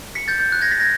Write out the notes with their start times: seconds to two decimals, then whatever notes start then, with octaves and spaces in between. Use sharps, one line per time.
0.15 B6 C#7
0.28 G6 A6
0.40 G6
0.52 F#6
0.62 G#6 A#6
0.71 A6 B6
0.80 G#6 A#6